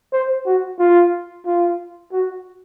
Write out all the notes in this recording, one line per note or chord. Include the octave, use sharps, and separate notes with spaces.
C5
F#4
F4
F4
F#4